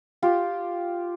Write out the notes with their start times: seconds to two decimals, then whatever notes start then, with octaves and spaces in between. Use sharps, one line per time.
0.22 F4 G4